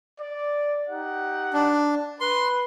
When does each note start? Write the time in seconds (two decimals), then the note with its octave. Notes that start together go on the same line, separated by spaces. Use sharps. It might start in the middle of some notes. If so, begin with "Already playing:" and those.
0.20 D5
0.89 D#4 G4 F#5
1.54 D4
2.21 B4 C6